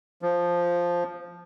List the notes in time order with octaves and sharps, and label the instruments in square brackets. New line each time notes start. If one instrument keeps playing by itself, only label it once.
[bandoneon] F3